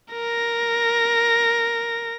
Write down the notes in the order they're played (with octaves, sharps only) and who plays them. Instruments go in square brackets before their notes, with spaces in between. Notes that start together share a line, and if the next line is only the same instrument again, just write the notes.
[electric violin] A#4 A#6